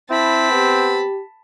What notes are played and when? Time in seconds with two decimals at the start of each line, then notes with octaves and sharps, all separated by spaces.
0.10 C4 E4 A5 B5
0.51 B3 G4